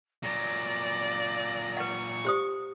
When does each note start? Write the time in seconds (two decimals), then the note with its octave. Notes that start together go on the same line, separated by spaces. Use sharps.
0.23 A#2 F#3 D5 A#6
1.77 B4 F#5 C#6
2.25 G4 C5 D#6